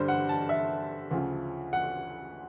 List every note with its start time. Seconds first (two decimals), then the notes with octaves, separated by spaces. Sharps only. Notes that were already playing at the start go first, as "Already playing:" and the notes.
Already playing: G2 D3 G3 C5
0.08 F#5
0.29 A5
0.49 E5
1.11 D2 C#3 F3
1.73 F#5